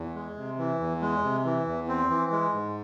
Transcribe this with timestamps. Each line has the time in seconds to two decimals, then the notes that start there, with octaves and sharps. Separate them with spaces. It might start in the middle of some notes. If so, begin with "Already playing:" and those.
Already playing: E2
0.15 G#3
0.36 C3
0.58 E3
0.80 E2
1.01 G#3
1.24 C3
1.45 E3
1.67 E2
1.88 C4
2.10 E3
2.32 G#3
2.53 G#2